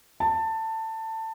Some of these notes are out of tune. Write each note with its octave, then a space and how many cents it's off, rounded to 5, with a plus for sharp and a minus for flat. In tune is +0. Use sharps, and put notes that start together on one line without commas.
A5 +20